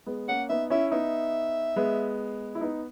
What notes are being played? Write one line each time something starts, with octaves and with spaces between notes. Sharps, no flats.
G#3 B3
A#3 C#4 F#5
B3 D#4 E5
C#4 E4 E5
B3 D#4 E5
G#3 B3
E4
B3 D#4